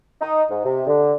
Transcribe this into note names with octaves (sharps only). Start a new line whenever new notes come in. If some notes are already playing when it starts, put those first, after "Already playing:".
D#4
G#2
C3
D3